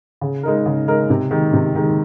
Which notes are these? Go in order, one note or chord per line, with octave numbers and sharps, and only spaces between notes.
C#3
G#3 D#4 A#4
C#3
G#3 D#4 A#4
C3
D#3 G#3
C3
D#3 G#3